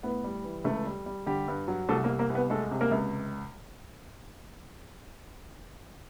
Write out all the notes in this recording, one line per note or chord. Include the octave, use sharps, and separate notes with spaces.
A2 B3 B4
G3
E3
C#2 A3 A4
G3
G3
D3 G3 G4
G2
F#3
C2 A3 A4
A#3 A#4
C2
A#3 A#4
C2
B3 B4
G#3 A3 A4
C3
A#3 A#4
C#2